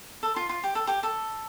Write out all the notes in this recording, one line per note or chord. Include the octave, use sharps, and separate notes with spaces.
A4
F4
F4
G4
A4
G4
A4